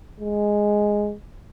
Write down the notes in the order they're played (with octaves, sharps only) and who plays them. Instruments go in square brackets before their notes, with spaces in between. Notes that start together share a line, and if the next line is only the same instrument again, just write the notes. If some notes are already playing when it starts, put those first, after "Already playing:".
[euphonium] G#3